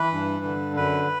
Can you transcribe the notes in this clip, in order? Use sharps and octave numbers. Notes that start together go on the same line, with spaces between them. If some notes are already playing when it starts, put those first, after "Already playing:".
Already playing: E3 B4
G2
D3
F#2 B4